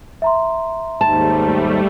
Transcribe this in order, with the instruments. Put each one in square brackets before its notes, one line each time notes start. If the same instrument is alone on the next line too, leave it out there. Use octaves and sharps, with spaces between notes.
[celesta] E5 A#5 C6
[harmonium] D#2 G#2 [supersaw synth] G3 A3 [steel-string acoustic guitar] A5